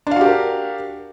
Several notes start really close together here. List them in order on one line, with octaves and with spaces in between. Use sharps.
D4 F5 F#4 G4 A#4